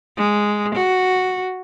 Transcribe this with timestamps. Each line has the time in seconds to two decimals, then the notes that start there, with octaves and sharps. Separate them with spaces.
0.17 G#3
0.75 F#4